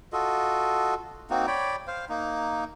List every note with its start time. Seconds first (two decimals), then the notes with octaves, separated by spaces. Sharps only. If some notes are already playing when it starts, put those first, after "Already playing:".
0.13 F4 F#4 A4 D#5
1.30 A#3 C4 D#4 F#4
1.47 C#5 D5 G5 B5
1.87 C5 F5
2.09 A#3 D#4